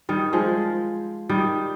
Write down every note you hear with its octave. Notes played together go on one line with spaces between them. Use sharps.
D#3 G3
F3 G#3
D#3 G3